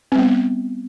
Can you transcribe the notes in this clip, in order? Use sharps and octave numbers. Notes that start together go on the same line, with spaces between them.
G3 B3 C4